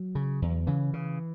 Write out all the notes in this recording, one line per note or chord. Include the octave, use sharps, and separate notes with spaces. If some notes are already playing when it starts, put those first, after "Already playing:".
Already playing: F#3
C#3
E2
C#3 E3
C#3